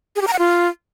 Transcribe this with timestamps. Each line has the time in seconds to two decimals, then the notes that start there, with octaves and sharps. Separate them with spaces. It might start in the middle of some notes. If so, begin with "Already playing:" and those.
0.16 G#4
0.22 G4
0.27 A#5
0.33 F#5
0.39 F4